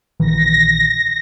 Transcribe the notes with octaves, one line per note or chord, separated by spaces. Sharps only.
A#1 D#3 E3 A#6